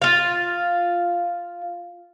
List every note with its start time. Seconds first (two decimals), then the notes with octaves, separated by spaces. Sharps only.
0.02 F4 F5